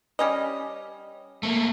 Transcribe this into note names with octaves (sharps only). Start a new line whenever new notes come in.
G3 C#4 D#5
A3 A#3